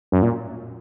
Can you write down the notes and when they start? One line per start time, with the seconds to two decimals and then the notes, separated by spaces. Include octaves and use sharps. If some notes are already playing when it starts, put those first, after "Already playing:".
0.12 F#2
0.22 A#2